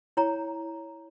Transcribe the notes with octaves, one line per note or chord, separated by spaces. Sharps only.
E4 C#5 G5 A#5